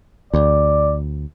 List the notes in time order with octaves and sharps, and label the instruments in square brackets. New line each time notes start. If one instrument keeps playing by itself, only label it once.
[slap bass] D2 [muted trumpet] D5